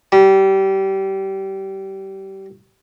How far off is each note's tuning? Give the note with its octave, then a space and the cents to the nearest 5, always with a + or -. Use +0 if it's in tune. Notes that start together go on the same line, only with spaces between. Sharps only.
G3 -25